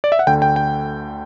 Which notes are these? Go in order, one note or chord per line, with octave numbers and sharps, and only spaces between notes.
D5
E5
F#5
D2 D3 G5
G5
G5